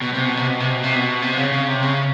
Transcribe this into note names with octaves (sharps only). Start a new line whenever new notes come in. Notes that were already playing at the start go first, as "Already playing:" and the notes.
B2
C3
B2
C3
B2
C3
B2
C3
B2
C3
C#3
C#3
C3
C#3